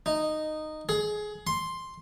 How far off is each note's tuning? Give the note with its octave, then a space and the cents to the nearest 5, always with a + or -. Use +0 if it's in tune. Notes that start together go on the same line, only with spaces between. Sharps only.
D#4 -10
G#4 +20
C6 +5